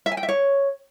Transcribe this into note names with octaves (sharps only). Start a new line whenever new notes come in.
E5
G#5
G5
E5
C#5